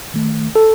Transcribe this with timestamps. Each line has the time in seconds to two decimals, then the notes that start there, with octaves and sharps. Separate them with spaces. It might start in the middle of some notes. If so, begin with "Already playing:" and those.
0.14 D#3 A3
0.56 A4